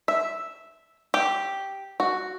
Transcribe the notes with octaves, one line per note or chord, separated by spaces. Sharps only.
E5
G4
F#4